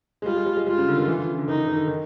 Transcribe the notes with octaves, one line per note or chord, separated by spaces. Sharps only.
G#3
G3 F4
G#3
G3
G#3
G3 F4
C#3
D3
D#3
E3
D3
C#3
D3
D#3 D#4
D3
D#3
D3
D#3